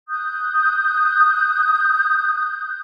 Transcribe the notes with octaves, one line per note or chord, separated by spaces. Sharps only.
D#6 F#6 G6